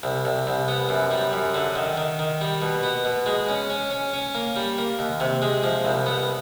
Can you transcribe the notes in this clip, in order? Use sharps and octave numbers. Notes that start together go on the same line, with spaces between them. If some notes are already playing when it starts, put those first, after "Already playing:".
C2
C2
C2
B3
F#2
G3
F#2
D3
D#3
D#3
D#3
G3
B2
B3
B2
G#3
C#4
C#4
C#4
C#4
A#3
G3
A#3
D#2
C3
G#3
F3
C2
B3